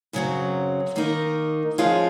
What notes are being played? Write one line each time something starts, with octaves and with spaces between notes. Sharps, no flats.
F#2 C#3 F#3 C4
D#3 A#3 D#4 A#4
F3 G#3 C#4 F4